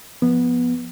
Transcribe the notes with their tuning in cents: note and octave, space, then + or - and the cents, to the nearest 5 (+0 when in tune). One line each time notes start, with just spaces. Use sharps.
F3 +0 B3 -10